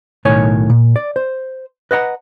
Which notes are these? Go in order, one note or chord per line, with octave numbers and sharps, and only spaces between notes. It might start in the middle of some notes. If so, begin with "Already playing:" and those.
B1 A2 D#3 C#5 G#5
A#2
D5
C5
B4 D#5 F#5 A#5